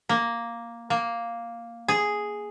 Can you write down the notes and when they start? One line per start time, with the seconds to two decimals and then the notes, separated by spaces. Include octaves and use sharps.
0.09 A#3
0.90 A#3
1.88 G#4